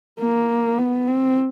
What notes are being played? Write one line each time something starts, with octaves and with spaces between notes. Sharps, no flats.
A#3
B3
C4